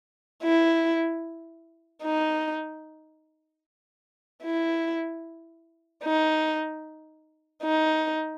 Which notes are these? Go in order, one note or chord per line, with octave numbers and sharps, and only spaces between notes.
E4
D#4
E4
D#4
D#4